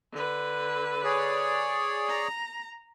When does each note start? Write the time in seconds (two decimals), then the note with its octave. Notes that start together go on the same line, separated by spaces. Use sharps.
0.13 D3 B4
1.04 G#4 C#5 D5
2.08 A#5